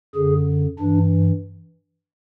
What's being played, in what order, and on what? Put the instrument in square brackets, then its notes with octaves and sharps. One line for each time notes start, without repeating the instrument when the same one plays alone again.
[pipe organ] F#2 D3 G#4
G2 E3 D4